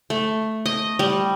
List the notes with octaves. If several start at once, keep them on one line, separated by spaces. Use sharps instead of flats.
A3
D#5
G3